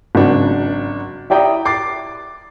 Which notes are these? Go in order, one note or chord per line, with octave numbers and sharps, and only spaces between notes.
G#1 C#3 F#3 D4 F#5
E4 G4 D5 G5 A#5 D#6
D6 A6 C7